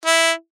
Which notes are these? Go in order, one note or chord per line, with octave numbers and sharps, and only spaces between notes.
E4